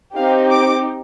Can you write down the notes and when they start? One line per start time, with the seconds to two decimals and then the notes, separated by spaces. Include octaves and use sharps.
0.15 C4 D#4 G4 F5
0.50 D6